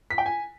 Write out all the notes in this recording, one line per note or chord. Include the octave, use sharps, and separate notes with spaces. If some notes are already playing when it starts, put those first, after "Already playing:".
B6
G5
G#5